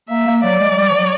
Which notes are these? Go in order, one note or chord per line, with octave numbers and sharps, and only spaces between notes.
A#3 E5
A#3
F#3 D5
G#3
F#3
G3
F3
F#3